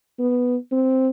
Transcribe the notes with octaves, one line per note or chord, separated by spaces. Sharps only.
B3
C4